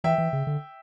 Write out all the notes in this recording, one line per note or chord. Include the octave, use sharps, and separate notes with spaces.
E3 E5 G5
E3
C#3
D3